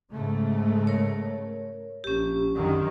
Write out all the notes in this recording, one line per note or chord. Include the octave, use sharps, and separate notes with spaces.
G#2 C#3 A3
A#4 C#5
A#1 C#4 G4
F#2 D3 D#3